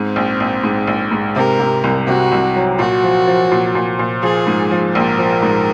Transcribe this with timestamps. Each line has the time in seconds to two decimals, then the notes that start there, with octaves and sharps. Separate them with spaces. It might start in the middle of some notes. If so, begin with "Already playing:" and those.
Already playing: G#2 C4
0.16 A#1
0.40 A#1
0.64 G#2
0.87 A#1
1.11 G#2
1.36 C3 A#4
1.60 C3
1.84 C2
2.07 C3 F#4
2.32 C2
2.56 F#3
2.79 A#2 F#4
3.04 F3
3.27 F3
3.52 A#2
3.75 A#2
3.99 A#2
4.23 F3 G#4
4.47 G#2
4.71 F3
4.95 A#1 A#4
5.18 F3
5.42 G#2